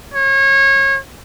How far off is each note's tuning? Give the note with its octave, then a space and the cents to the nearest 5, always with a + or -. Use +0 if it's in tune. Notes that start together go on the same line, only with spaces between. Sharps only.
C#5 -30